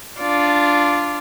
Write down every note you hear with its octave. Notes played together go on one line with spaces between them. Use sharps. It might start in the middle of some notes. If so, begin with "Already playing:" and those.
D4 F4 D5